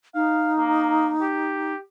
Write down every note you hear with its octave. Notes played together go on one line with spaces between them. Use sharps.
D#4 F5
A#3
G4